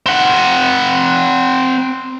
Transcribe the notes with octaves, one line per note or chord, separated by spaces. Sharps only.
C4 F#5